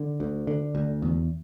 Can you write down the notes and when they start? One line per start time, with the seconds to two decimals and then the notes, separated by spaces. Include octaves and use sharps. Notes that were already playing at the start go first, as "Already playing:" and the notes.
Already playing: D3
0.20 D2
0.47 D3
0.75 D2
1.02 E2